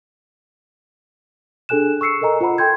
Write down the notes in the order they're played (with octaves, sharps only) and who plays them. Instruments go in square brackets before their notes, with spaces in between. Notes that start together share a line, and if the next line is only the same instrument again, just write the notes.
[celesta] D4 G#4 A4 G#5 F#6 E7
C#6 E6 C7 C#7
A4 A#4 D#5 G#5 A#5
F4 C5 F#5 A#5 B5
A4 G5 C6 G6 G#6